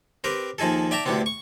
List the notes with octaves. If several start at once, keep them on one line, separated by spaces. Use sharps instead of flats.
C4 G4 A#4 B4
D#2 F3 D#4 G#4 A4
D5 E5 G5 A5 A#5
D2 A2 D3 G3 B3 C4
C#6